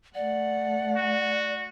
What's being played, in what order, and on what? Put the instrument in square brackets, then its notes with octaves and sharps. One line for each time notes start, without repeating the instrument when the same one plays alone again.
[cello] A3 F#5 [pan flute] D5
[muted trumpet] F#4